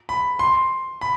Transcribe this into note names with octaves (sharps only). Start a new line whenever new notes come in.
B5
C6
B5